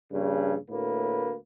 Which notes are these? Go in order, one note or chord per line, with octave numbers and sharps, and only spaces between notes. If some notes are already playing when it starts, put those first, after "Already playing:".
A#1 G2 C#3
D2 A2 A#3 B4